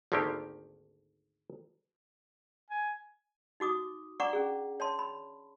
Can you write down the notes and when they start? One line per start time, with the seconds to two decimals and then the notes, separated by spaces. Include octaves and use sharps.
0.12 G#1 D2 D3 D#3 A#3 G4
2.70 G#5
3.60 D#4 F#4 D6 D#6
4.20 D4 D5 F#5 A#5 C#6 D6
4.33 C#4 G#4
4.80 C#5 A5 C6
4.99 B5